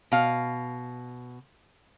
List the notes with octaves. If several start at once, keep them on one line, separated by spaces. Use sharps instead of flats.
B2 F5